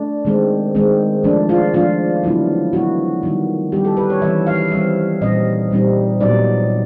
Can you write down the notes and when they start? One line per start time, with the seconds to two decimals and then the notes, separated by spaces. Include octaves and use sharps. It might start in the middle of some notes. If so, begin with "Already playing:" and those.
Already playing: A3 D4
0.25 D#3 G#3 C4
0.75 D#3 G#3 C4
1.24 F3 A3 D4
1.49 F4
1.74 F3 A3 D4 F4
2.24 D3 F#3 B3 E4
2.73 D3 F#3 B3 E4 F#4
3.23 D#3 G3 B3 D#4
3.72 D#3 G3 B3 D#4 G4
3.85 A4
3.97 B4
4.10 C#5
4.22 E3 G3 C4 E5
4.47 F5
4.71 E3 G3 C4 E5
5.21 A#2 G3 C4 D#4 D#5
5.71 A#2 G3 C4 D#4
6.21 A#2 F#3 B3 D#4 D5